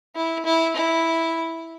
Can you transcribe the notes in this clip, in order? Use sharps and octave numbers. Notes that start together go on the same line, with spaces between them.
E4
E4
E4